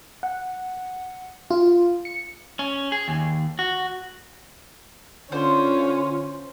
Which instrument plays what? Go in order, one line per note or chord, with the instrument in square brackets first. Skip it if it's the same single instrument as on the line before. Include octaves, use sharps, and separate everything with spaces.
[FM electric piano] F#5
F4
C#7
[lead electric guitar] C#4
G#4
D#2
F#4
[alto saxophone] D3 [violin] C#4 [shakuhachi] F4 [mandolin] C5